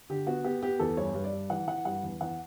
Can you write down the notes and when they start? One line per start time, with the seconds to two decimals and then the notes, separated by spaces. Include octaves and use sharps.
0.10 D3 G4
0.27 B3 F#4
0.44 B3 G4
0.63 B3 G4
0.79 E2 A4
0.97 G2 C#5
1.14 G2
1.24 D5
1.32 G2
1.50 E3 F#5
1.67 E3 F#5
1.85 G2 F#5
2.03 E2
2.21 E2 F#5